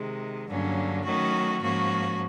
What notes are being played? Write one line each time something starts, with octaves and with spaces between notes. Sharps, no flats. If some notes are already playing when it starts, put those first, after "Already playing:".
Already playing: C3 D#3 G#3
G2 D3 F#3 A#3 C#4
D#3 F#3 A3 C#4 F#4
G#2 F3 A#3 C#4 F#4